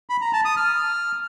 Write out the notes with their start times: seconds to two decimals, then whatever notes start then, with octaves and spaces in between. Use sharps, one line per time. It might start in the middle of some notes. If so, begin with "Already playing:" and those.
0.10 B5
0.21 A#5
0.33 A5
0.45 D#6
0.57 F6